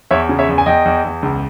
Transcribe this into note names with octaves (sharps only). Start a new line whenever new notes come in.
E2 C#5 E5
C#3
C#5 E5
E2
G#5
E2 D#5 G5
E2
E2
C#2